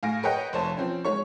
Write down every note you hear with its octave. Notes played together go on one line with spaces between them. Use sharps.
A2 F5 G#5 A#6 D7
A#4 B4 C#5 D#5 F#5 G5
F1 C5 C#5 A5
F3 C4 C#4
G#3 C#5 C#6